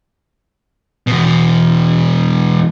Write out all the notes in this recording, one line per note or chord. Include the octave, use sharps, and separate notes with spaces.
E2 B2